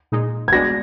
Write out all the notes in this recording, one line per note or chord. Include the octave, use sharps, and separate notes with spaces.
A#2 G#3 D#4
G#6
G#3 B3 D4 F#4 A#6